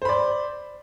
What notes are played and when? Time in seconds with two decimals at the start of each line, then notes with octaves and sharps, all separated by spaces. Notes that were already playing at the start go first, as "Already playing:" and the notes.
0.02 C5
0.05 B5
0.09 D5